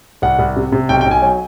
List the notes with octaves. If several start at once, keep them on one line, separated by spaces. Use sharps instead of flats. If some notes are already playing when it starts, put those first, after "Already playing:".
C2 F#5
C2
C3
C3
B1 G5
G5
B1
G#5
F#3